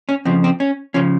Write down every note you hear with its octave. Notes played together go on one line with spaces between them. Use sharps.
C#4
F2 C#3 F3 C4
C4
C#4
C#3 F3 C#4